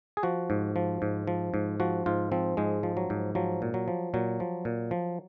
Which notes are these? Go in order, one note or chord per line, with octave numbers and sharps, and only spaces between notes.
G#4
F3 F#4
G#2
F3
G#2
F3
G#2
F3 F#4
G#2 F4
F3 C4
G#2 G#3
F3
F#3
G#2
F3 F#3
A#2
F#3
F3
A#2 F#3
F3
A#2
F3